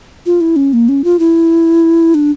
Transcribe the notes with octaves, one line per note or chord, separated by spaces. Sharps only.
F4
E4
C#4
A#3
C#4
F4
E4
D4